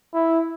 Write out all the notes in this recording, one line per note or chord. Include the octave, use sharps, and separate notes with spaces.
E4